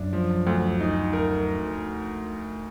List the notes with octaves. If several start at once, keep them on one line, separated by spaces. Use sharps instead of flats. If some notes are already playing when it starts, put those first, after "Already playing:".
Already playing: F#2 D4
F3
D2
D#4
A#4